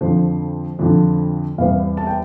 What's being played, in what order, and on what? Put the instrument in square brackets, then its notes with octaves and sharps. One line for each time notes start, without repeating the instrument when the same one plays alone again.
[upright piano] F2 D3 F3 C5
F2 D3 F3
E2 C3 G3 B3 F5
A5
G5